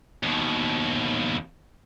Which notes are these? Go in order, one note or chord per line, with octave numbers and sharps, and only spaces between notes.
D#2 B2